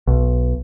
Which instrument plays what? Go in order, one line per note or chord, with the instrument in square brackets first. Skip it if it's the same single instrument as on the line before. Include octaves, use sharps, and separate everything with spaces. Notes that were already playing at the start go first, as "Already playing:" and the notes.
[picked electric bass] B1